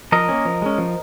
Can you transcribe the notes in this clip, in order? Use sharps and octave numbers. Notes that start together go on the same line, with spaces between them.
F3 A#4 D#5
A#3 C#4
F3
G#3 C#4
F3